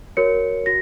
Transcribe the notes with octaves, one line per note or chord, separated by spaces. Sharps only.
F#4 A#4 C#5 C#7
F#4 A#6